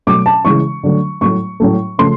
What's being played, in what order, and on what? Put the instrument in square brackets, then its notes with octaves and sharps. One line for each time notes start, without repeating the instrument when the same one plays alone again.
[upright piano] B2 F#3 A3 D6
A5
C#3 E3 G#3 C#6
D3 F#3 A3
A2 F#3 A3 C#6
A2 F#3 A3
C#3 F3 A3 C6